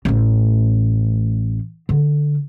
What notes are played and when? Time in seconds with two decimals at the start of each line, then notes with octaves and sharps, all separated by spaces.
0.05 A1 A3
1.89 D3